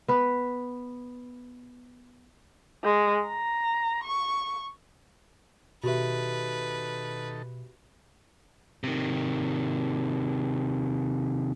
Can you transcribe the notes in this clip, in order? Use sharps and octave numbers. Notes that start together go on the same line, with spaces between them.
B3 B4
G#3
A#5
C#6
B2 D#3 F#4 G4 A4 B4 E5
C3 D#3